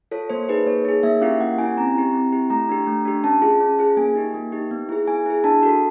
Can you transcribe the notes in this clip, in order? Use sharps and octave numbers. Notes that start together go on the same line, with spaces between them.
F4 A4 C#5
A#3 C5
D#4 G#4 B4
A#3 C#5
D#4 G#4
A#3 E5
C#4 E4 G4 F5
A#3 F#5
C#4 E4 G4 G#5
C4 A#5
E4 G4
C4
E4 G4
A3 A#5
D4 G4
A3
D4 G4
C#4 A5
F4 G#4
C#4
F4 G#4
A#3 G#5
D#4 G4
A#3
D#4 G4
B3
E4 G#4
B3 G#5
E4 G#4
D4 A5
F#4 A4